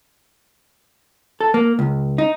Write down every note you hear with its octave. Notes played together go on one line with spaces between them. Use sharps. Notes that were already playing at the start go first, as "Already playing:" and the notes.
A4
A#3
C#2
D#4